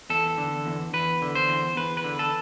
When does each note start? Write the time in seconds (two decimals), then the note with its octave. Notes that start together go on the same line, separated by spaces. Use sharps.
0.10 E2 A4
0.38 D3
0.66 E2
0.93 E2 B4
1.22 D3
1.35 C5
1.49 E2
1.76 E2 B4
1.97 B4
2.04 D3
2.19 A4